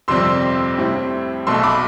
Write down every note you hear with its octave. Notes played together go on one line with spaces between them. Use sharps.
G1 F2 C3 G3 C4 C6 E6
A2 G3 C4 E4
B1 B2 A3 C6 E6
B5 D6